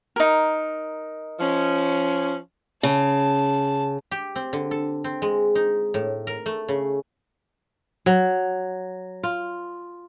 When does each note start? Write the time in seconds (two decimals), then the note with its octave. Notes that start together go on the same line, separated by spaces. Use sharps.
0.16 D#4 A#4
1.40 F3 C#4
2.83 C#3 A5
4.11 G4
4.36 C4
4.53 D3
4.71 A4
5.04 C4
5.22 G#3
5.55 D#4
5.94 A2
6.27 A#4
6.46 A3
6.68 C#3
8.06 F#3
9.23 F4